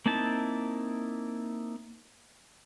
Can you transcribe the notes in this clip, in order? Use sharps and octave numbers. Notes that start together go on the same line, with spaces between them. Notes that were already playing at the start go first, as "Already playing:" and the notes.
A#3 C4 D#4 E4 A5